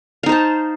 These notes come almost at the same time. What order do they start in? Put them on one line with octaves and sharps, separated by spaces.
F5 D#4 C5 A5